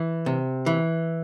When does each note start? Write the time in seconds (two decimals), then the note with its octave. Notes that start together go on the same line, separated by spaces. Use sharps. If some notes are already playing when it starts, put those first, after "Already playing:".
Already playing: E3
0.26 C3
0.66 E3